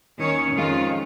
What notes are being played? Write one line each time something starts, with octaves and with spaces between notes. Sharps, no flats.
D#2 D#3 C#4 C#5
F2 D#3 G#3 C#4 F4